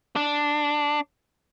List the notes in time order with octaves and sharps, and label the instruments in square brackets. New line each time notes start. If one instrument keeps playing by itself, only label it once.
[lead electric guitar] D4